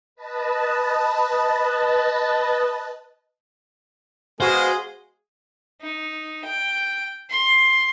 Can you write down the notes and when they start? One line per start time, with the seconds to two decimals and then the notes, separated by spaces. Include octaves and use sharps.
0.15 B4 D#5 A5
4.40 G#3 B3 F#4 G#4 C5 F5
5.81 D#4
6.44 G5
7.30 C6